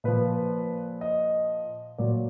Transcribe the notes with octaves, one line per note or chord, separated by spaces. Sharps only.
A#2 F3 B4
D#5
A#2 F#3 D5